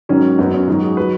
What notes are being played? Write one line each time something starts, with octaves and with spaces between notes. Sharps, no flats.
G#2 D#3 F#3 C#4
F#2 F#3 B3
C#4
G#2 D#3 F#3 F#4
G#4
F#3 B4